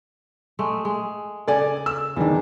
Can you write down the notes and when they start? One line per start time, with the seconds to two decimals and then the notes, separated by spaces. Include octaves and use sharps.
0.59 G#3 A3
0.85 G#3
1.47 C#3 A4 D5 G#5
1.86 E6
2.16 E2 D#3 E3 D4